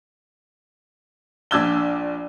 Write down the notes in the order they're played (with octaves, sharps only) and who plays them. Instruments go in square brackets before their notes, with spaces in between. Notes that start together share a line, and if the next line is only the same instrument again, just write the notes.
[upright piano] A#1 D4 D5 E6 G#6 G7